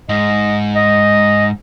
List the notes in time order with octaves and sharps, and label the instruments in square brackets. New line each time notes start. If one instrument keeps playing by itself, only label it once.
[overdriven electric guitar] G#2 [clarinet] D#5
[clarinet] D#5